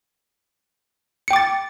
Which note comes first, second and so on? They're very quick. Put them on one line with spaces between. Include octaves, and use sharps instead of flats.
C#7 G5 D6 A6